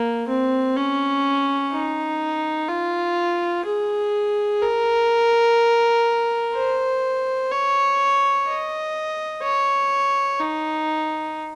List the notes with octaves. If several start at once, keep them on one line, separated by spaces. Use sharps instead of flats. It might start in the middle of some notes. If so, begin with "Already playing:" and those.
Already playing: A#3
C4
C#4
D#4
F4
G#4
A#4
C5
C#5
D#5
C#5
D#4